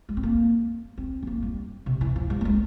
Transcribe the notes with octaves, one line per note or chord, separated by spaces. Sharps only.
G#3
C4
A#3
C4
C4
A#3
G3
C3
E3
F3
G3
A#3
G#3